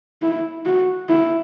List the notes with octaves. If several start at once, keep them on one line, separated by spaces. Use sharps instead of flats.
E4
F#4
E4